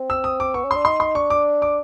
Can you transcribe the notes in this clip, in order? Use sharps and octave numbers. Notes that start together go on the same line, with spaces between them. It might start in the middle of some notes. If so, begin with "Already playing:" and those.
Already playing: C4
E6
D#6
D6
B3 C#6
C#4
D4 C6
D#4 C6
C6
D4 C#6
D6
D6